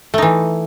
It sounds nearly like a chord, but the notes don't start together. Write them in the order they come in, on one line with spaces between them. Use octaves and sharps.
A3 D#4 E3